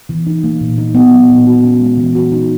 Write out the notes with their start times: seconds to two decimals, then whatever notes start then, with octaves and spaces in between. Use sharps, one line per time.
0.09 E3
0.27 D#4
0.44 A#3
0.61 A#2
0.78 D#4
0.95 B3
1.12 F#3
1.29 A#2
1.47 F#4
1.63 C#4
1.81 G#3
1.97 E3
2.15 F#4
2.32 D#4